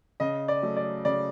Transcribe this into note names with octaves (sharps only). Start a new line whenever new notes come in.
C#3 D#5
D5
F#3 A3
D5
C#3 D5